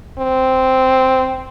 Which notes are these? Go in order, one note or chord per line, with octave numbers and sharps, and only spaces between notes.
C4